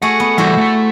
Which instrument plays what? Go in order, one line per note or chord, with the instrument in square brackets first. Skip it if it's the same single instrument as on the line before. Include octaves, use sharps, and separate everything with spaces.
[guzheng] A3 F#4 G#4 [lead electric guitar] F#5
[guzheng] B3
[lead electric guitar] E3 G3 [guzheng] E4 F#4 C5
[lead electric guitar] A3 A4